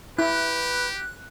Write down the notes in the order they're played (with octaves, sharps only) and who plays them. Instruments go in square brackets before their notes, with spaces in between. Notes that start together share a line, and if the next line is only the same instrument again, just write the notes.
[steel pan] E4 [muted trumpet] G4 [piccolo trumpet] B4 [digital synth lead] F#6